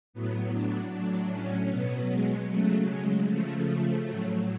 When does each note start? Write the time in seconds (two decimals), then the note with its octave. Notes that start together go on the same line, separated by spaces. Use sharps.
0.13 A2 F#3 B3
0.53 D4
0.92 A2 F#3 D4
1.31 C#4
1.70 B2 F#3 B3
2.09 G#3
2.49 C#3 F#3 A3
2.88 G#3
3.27 C#3 F3 A3
3.66 A3
4.05 A2 F#3